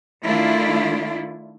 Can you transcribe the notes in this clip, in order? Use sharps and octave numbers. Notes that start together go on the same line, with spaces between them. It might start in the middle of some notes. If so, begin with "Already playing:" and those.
D#3 A3 D4 E4 F4